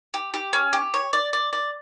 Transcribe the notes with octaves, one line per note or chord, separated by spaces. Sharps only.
G4
G4
C#4
G4
C#5
D5
D5
D5